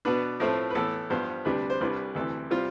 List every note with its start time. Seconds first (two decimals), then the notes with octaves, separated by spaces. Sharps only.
0.05 B2 B3 D4 B4
0.40 A2 F3 A3 C4
0.70 B4
0.75 A2 E3 B3 A4
1.10 G2 F3 B3 C5
1.45 D2 C3 G3 D4 B4
1.70 C5
1.81 C2 C3 G3 D4 B4
2.15 D2 C3 E3 A4
2.50 C3 G3 C4 F4